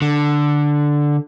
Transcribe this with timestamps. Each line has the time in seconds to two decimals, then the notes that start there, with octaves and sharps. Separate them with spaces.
0.02 D3